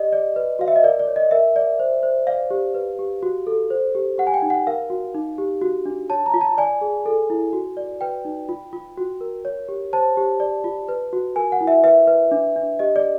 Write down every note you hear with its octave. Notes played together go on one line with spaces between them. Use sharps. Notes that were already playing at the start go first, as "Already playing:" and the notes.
Already playing: G4 D5 D#5
D5
B4
F#4 F5
E5
D#5
A#4 D5
D5
C#5
D#5
A#4 E5
D5
C5
C5
D5 F5
G4
B4
G4
F#4
A4
C5
G4
G4 F#5
G#5
G5
D#4
F#5
A#4 F5
F#4
D#4
G4
F#4
D4
C#5 A5
A#5
F4
A5
D5 G#5
G#4
A4
E4
F#4
D5
B4 G5
D#4
F4
F4
F#4
A#4
C#5
G4
C5 A5
G4
D5
F4
B4
F#4
A#4 G#5
F#5
E4
E5
B4 E5
B4
D4
D4
G4 D#5
D5